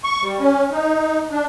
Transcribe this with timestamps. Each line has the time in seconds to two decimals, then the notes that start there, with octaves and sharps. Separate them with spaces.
0.04 C#6
0.22 G3
0.39 C#4
0.71 D#4
1.30 D4